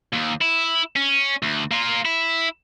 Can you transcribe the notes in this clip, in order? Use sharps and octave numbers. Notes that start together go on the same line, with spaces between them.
D#2
E4
C#4
D2
A#3 F4
E4